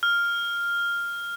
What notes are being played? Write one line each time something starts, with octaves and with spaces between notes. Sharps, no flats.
F6